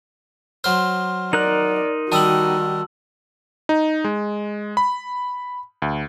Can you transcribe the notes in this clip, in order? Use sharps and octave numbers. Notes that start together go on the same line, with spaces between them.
F#3 C5 C6 F6
D#4 A#4 D5 F#6 F#7
D#3 G3 F#4 D#5 A5 E6 F#7
D#4
G#3
B5
D2